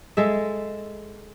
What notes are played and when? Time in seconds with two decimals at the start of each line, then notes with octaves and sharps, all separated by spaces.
0.17 G#3 A4 E5